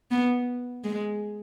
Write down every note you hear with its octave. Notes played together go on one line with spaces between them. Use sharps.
B3
G#3